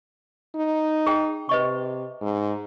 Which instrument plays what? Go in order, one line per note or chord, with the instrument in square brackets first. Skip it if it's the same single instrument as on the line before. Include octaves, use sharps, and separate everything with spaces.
[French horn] D#4
[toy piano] G#4 G5
[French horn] C3 [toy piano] B4 D#5 C#6
[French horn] G#2